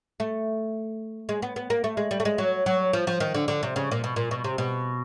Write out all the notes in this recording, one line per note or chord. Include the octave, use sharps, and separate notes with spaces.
A3
G#3
B3
B3
A#3
A3
G#3
G3
A3
G#3
F#3
F#3
F3
F3
D#3
D3
D3
C3
C#3
A#2
B2
A#2
B2
C3
B2